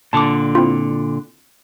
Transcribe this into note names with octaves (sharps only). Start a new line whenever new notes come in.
A#2 D3 A5 D6
C4 E4 F4